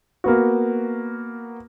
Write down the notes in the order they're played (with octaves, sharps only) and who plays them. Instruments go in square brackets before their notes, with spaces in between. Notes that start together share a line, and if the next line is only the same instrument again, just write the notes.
[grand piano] A#3 B3 F#4